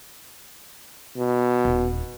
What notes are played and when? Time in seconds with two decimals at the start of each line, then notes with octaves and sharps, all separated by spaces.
1.17 B2
1.65 D#1